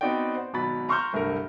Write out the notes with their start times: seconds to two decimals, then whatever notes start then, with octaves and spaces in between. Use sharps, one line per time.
0.01 B3 C4 D#4 F#4 D5 G5
0.35 C5
0.53 G#1 B2 F#3 B5 A6
0.89 A#5 C6 C#6 E6 F6 G6
1.13 D1 C2 G2 A#4